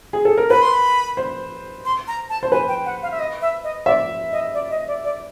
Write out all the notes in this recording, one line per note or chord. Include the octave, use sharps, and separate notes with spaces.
G#4
A4
A#4
B4 B5
C6
B5
C5
C6
A#5
A5
C5
B4 G#5
G5
F#5
F5
E5
D#5
E5
D#5
D5 E5
D#5
D5
D#5
D5
D5